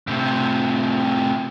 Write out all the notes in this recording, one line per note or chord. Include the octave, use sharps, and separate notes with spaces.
A2 C3